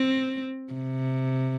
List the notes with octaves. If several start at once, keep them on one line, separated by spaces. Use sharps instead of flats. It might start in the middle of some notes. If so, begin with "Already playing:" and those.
Already playing: C4
C3